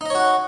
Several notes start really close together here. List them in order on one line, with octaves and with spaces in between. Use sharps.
D#4 D#5 C#5 F#4 F#5